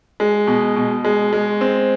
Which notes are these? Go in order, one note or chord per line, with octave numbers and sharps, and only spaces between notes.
G#3
B2
B2
G#3
G#3
C4